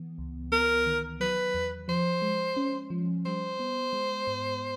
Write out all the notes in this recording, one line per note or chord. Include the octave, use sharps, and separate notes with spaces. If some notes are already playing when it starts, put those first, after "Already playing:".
Already playing: E3 B3
C#2
B3 A#4
D#3
F#3 B4
E2
F3 C5
G#3
C#4
F3
G3 C5
B3
G#3
G#2